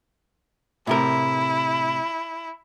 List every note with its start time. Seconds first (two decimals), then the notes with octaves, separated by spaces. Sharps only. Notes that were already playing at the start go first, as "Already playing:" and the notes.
0.87 A2 C3 E4 A#4